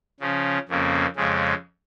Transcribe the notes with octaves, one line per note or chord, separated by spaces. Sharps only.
C#3 F3 C#4
F2 C#3 A#3
F2 C#3 G#3